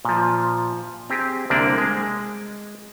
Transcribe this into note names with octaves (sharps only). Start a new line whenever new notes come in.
A#2 F3
C4 G4 G#4
C2 D3 A#3 C4 D4 D5
G#3